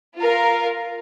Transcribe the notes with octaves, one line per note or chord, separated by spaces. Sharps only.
F4 A#4 F5